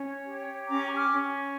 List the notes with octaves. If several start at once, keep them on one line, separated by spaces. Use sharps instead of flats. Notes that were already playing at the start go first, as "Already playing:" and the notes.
Already playing: C#4 C#5
G4
C#4 A#5 D6
D6 F6
C#4